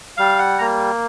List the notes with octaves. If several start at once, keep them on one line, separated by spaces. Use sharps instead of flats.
G3 F5
F#5
A#3 A#5